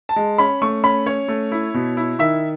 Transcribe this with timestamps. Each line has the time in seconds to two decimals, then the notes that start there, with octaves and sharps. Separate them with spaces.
0.09 A5
0.16 G#3
0.38 C#4 B5
0.62 A3 C#6
0.84 C#4 B5
1.06 C#4 C#5
1.28 A3
1.52 E4
1.74 B2
1.97 E4
2.19 D#3 E5